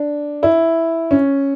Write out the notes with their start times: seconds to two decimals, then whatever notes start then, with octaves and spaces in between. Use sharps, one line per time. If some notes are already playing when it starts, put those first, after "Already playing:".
Already playing: D4
0.43 E4
1.11 C#4